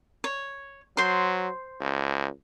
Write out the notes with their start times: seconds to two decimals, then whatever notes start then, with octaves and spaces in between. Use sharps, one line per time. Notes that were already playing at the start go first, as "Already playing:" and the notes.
0.24 C#5
0.97 F#3 C5 C6
1.80 C#2